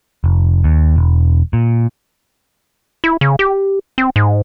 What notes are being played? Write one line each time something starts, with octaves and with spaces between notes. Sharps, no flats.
F1
D#2
E1
A#2
E4
C#3
G4
C4
G#2